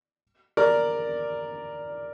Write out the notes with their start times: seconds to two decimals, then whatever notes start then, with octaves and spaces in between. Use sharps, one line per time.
0.57 A#4 D5